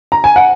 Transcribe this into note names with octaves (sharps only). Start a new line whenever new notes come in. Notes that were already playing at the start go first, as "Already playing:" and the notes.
A#5
G#5
F#5